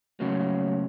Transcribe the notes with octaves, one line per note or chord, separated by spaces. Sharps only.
A2 C#3 F#3 A#3